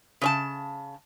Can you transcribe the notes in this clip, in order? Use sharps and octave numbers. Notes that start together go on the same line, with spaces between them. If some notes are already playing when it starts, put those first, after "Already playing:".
C#3 C#5 A5